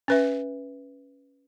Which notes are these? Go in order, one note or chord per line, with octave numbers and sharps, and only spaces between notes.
C#4 B4 E5